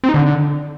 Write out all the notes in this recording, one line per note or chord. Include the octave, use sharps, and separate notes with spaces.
C4
D#4
D3